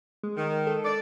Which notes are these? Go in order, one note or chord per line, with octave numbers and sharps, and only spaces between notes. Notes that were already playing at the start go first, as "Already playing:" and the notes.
G#3
D#3
A4
D5